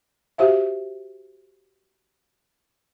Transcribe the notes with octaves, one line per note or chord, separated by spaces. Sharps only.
F#4 G4 C5 E5 F5